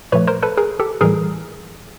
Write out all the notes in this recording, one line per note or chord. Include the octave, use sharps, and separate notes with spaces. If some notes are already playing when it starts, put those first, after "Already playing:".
A#2 F3 A3 B4 C#5
A#4 C5
A4 B4
G#4 A#4
G4 A4
A2 E3 G3 G#4 A#4